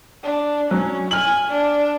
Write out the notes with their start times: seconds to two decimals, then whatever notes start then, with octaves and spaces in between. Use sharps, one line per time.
0.24 D4
0.71 F#3 C#4
1.11 G#5 F6 F#7
1.49 D4